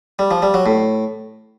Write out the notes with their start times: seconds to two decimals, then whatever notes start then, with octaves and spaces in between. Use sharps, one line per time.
0.19 G3
0.31 F3
0.42 G3
0.54 F#3
0.66 A2